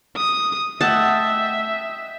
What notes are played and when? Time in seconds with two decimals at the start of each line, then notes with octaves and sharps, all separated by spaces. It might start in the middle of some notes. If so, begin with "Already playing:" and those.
0.17 D#6
0.81 A3 D#5 E5 F#5 G5 A5 E6